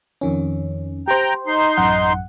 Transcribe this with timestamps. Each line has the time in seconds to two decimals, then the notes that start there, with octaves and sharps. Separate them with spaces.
0.21 F2 D#3 C#4
1.08 G4 C5 G5 A#5 G6
1.47 D#4 C6
1.77 A1 F#2 F#5